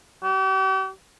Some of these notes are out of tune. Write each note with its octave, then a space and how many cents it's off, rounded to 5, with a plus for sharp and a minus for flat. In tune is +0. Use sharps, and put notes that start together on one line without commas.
G4 -45